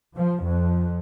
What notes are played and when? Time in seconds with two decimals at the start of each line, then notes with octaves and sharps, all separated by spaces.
0.16 F3
0.45 F2